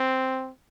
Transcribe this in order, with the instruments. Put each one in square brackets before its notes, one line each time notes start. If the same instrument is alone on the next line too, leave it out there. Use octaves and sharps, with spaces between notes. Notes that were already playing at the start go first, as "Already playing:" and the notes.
Already playing: [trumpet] C4